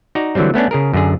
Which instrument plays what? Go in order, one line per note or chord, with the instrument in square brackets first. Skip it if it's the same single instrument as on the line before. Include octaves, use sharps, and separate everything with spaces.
[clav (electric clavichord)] D#4 F#4 D5 A#5
D3 E3 F#3 G3 C4
A3 B3 C#4 D4
C#3 G#4 A#4
F#2 D3 G#4